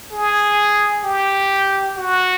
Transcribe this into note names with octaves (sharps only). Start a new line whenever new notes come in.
G#4
G4
F#4